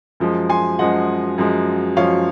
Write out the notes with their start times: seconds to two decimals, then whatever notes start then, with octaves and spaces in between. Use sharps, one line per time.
0.20 F#2 F3 G#3
0.50 G#5 C6
0.79 F#2 F3 G#3 D#5 F#5
1.38 F#2 F3 G#3
1.96 F#2 F3 G#3 C#5 F5